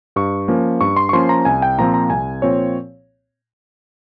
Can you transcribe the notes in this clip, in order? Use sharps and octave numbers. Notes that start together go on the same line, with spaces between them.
G2 C#6
F3 A#3 C#4
G2 C#6
C6
C#6
F3 A#3 C#4 C6
A#5
C2 G#5
G5
A#2 F3 C4 A#5
A#5
C2 G#5
A#2 F3 C4 C#5